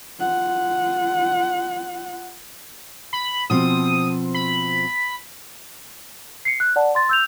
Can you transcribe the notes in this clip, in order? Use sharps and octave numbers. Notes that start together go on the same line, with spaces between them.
F4 F#5
B5
B2 F3 C4 D#6
B5
C7 C#7
F#6
D5 F#5 A5
C6 A6
E6 G6 F7